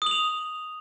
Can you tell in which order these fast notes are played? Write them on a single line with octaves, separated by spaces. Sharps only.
D#6 F#7 F7